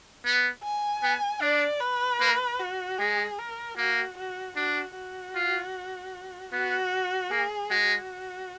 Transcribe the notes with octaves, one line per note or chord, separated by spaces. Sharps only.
B3
G#5
B3
D4 D5
B4
A#3
F#4
G#3 G#4
A#4
A#3 F#4
F#4
D4 F#4
F#4
F4
B3 F#4
A#3 G#4
G#3 F#4